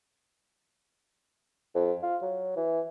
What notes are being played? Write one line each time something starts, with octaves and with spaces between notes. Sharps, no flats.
F2
F4
F#3
E3